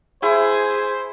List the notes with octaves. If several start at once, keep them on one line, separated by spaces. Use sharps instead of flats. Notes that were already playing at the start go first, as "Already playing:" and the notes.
E4 G#4 C5